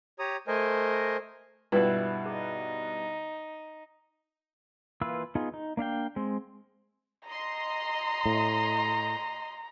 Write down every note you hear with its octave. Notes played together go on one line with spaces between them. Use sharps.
G4 C#5 A#5 D#6
A3 A#4 C5 D#5 G#5
G2 B2 E4 F4 B4 G5
D#4 G#4
E3 A#3 F4 B4 E6
B3 D#4 F4 G#4
D#4
A#3 D4 F5 G5
G#3 C4
D#5 A#5 C6
A2